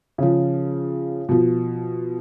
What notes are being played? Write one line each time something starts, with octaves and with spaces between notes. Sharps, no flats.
C#3 F3
B2 F3